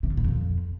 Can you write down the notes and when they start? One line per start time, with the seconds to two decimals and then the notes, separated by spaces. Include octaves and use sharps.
0.03 C3
0.10 G2
0.17 A#2
0.24 F2